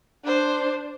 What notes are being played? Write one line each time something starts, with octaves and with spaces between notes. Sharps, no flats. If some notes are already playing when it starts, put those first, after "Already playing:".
D4 C5